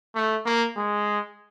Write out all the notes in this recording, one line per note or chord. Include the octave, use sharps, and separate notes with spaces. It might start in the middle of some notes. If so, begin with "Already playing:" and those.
A3
A#3
G#3